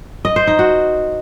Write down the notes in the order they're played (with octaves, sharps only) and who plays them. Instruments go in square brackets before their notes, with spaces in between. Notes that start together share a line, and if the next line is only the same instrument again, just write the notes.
[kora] D#5
C5
D#4
F#4